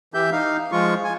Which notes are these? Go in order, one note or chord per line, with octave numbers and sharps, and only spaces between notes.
E3 G4 E5 G6
D#4 F5
F3 G#3 F4 C#6
G#5